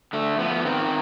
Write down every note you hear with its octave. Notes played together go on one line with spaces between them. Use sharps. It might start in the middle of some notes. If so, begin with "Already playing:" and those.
D3 A3
F3 B3
D#3 C4